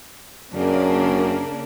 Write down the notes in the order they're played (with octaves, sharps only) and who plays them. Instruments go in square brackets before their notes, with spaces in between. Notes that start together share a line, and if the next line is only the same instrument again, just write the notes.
[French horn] F#2 [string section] C#3 A#3 D4